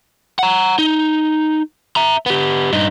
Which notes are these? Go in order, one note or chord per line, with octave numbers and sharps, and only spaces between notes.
F#5 A#5
D#4
E5 A#5
B3 G4
G2 D#4